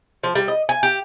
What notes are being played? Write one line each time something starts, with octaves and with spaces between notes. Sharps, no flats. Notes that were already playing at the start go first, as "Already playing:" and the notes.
F3
G3
D#5
G#5
G4